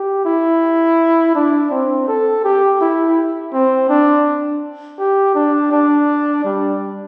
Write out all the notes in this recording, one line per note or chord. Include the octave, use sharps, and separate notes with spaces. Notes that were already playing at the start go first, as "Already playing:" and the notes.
Already playing: G4
E4
D4
C4
A4
G4
E4
C4
D4
G4
D4
D4
G3